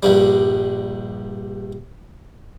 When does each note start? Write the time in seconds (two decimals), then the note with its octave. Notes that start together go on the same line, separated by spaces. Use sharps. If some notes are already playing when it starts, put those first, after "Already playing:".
0.03 A#1 G2 G3